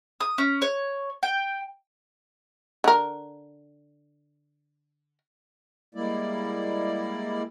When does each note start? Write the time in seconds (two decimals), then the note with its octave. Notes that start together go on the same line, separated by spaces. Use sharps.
0.21 D#6
0.38 C#4
0.62 C#5
1.23 G5
2.84 D3 A#4
5.95 G3 G#3 A#3 E4 D5